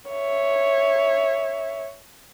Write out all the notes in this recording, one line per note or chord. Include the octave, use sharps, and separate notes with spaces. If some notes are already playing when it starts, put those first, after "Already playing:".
C#5 E5